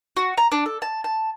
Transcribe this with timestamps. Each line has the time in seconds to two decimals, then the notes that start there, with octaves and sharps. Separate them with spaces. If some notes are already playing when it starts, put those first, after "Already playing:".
0.17 F#4
0.38 A#5
0.52 D4
0.66 A4
0.82 A5
1.04 A5